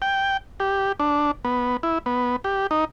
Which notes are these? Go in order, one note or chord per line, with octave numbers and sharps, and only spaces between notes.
G5
G4
D4
B3
E4
B3
G4
D#4